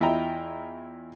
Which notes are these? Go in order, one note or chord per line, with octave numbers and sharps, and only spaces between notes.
E2 E4 F4 D#5 G5 A#5